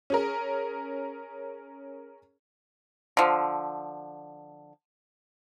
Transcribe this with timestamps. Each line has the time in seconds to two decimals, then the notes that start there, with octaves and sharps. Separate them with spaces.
0.10 C#4 G#4 A#4
3.17 D3 F3